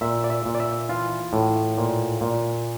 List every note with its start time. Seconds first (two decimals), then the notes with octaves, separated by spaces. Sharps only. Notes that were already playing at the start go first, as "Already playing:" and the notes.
0.01 A#2 E5
0.24 D5
0.30 E5
0.45 A#2
0.55 D5
0.60 E5
0.89 E3 F4
1.33 A2
1.78 A#2
2.21 A#2